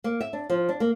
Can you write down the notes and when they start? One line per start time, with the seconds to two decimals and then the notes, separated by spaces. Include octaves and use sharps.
0.04 A#3
0.21 E5
0.33 D4
0.50 F3
0.69 D4
0.80 A#3